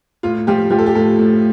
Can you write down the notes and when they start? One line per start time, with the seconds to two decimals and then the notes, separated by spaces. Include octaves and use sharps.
0.23 A2 F4
0.47 F3 G4
0.70 F3 G4
0.78 A4
0.86 G4
0.95 A2 A4
1.19 A2